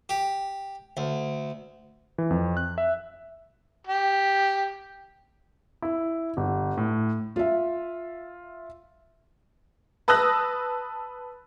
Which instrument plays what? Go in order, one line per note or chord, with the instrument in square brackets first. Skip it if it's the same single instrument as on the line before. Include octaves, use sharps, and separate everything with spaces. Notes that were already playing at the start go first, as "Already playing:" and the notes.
[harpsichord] G4
D2
[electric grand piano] E3
F2
F#6
E5
[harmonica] G4
[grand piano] E4
G1
A2
[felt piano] F4 E5
[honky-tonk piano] B4 A5 D#6 E6 F#6 A#6